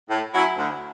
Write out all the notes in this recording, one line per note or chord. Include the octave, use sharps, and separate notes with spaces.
A2
F#3 C#4 E4
D2